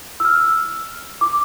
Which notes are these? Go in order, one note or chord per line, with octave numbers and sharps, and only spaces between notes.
E6
F6
D6